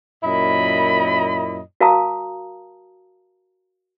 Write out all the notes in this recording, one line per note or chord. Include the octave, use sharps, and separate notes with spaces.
F#2 A#2 E4 D#5 B5
F#4 A#4 F5 A5 A#5 D#6